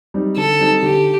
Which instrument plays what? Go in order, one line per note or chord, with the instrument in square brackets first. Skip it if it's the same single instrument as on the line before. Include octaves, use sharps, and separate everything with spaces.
[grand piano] G3 C4 D#4
[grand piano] D3 [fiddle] A4
[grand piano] G3 C4 D#4
[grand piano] D3 [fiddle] G4